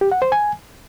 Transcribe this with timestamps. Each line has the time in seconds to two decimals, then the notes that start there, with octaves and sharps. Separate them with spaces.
0.01 G4
0.12 F#5
0.22 C5
0.32 G#5